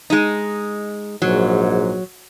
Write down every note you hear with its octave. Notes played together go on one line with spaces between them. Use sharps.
G#3 D#4
A#1 G#2 F#3